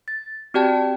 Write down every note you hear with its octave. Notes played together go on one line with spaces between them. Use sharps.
A6
C4 F#4 G4 D5 G5 A5